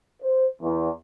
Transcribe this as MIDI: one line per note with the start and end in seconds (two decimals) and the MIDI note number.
0.21 0.46 72
0.61 0.89 40